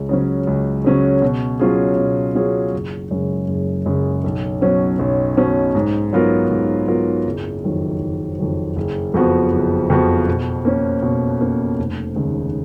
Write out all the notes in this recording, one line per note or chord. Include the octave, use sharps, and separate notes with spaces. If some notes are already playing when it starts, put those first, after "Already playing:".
Already playing: C#2
C#3 F#3 C#4
C#2
C#3 F#3 C#4
B2
F#3 C#4 F4 G#4
B2
F#3 C#4 F4 G#4
F#1
F#2 C#3 G#3
F#1
F#2 C#3 G#3
B1
B2 F#3 C#4
B1
B2 F#3 C#4
G#2
F#3 B3 F4 A#4
G#2
F#3 B3 F4 A#4
F#1
F2 D#3 F#3
F#1
F2 D#3 F#3
F#1
F2 F3 B3 F#4
F#1
F2 F3 B3 F#4
B2
A#3 C#4
B2
A#3 C#4
F1
D#2 C#3 G#3